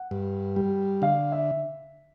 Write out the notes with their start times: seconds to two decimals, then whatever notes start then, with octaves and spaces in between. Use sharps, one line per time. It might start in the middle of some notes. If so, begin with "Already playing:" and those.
Already playing: F#5
0.11 G2
0.56 G3
1.02 D3 F5
1.32 E5